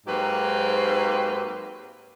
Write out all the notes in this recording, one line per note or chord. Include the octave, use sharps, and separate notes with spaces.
G#2 F#3 A#3 C4 G4 B4